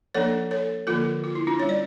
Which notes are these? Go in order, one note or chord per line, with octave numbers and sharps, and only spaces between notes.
F3 A#3 D4 A4 C#5
A4 C#5
D3 F3 A#3 F4 A4
F4
E4
D4 F4
G3 C#4 C#5
D5